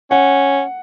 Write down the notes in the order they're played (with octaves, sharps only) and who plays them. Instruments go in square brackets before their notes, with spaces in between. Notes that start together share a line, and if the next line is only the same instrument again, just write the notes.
[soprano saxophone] C#4 [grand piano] F#5